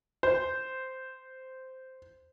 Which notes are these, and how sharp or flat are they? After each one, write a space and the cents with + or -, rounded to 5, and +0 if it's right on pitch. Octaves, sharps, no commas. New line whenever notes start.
C5 -5